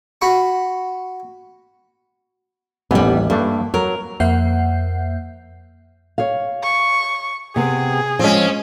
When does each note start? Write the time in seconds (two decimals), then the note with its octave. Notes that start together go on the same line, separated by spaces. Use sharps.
0.21 F#4 B5 C#6
2.91 A1 D#2 E3 G3 B3
3.30 G2 A3 A#3 D4
3.74 F#3 A#4
4.20 F2 A#3 E5 F#5 G6 C7
6.18 C#5 F5
6.64 C#6
7.56 C3 B3 C4 G#4
8.19 F3 G#3 C4 C#4